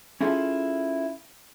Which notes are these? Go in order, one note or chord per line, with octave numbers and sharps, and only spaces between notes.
C#4 E4 F4 G#4 A4